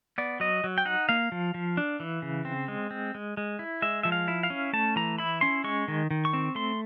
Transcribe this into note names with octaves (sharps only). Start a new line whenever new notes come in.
B3 D5
F#3 D#5
F#3
G5
D#4 F#5
A#3 F5
F3
F3
D4
E3
C#3
C4
G#3
C4
G#3
G#3
E4
G#3 E5
F3 E5
F5
E4
F5
C#4
A3 A5
E3 A#5
E4 B5
C#4 C6
G#3 C#6
D#3
D#3
C#6
C4
A3 C6